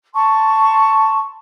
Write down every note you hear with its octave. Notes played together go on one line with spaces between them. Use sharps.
A5 C6 C#6